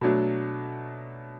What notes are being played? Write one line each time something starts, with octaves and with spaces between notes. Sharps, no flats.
B2 F#3 A3 D4